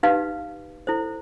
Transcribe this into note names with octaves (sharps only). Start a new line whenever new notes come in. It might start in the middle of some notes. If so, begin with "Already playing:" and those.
D#4 G4 B4 F5
E4 A4 C5